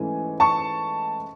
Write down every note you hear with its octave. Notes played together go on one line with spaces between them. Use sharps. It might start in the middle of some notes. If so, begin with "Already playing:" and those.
Already playing: G#2 E3 A3 C#4 G#5
A5 C#6